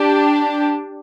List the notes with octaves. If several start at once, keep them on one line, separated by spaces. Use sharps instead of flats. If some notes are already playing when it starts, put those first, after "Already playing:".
Already playing: D4 G4